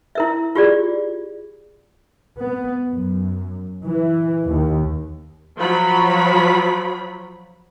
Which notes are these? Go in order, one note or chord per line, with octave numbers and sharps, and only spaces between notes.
E4 A#4 E5
F4 G4 G#4 D5
B3
F#2
E3
D#2
F3 F#3 B5